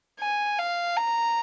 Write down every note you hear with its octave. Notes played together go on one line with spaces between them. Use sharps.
G#5
F5
A#5